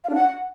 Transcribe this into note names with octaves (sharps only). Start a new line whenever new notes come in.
F5
D4
F#5